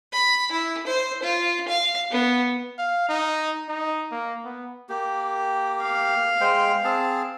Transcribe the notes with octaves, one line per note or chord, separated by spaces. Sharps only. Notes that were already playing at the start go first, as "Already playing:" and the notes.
B5
E4
C5
F4
F5
B3
F5
D#4
D#4
A#3
B3
A#3 G4
F5
G#3 C5 G5
C4 G#4 A5